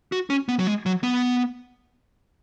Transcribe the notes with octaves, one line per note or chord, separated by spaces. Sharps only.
F#4
C#4
B3
F#3
G#3
F#3
B3